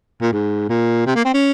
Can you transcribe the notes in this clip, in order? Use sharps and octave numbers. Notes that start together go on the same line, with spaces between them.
A#2
G#2
A#2
C3
A#3
C4
C#4